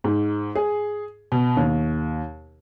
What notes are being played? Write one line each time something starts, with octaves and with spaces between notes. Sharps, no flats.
G#2
G#4
B2
D#2